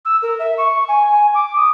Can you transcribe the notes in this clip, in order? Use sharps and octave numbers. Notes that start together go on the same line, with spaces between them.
E6
A#4
E5
C#6
G#5
G#5
D6
D#6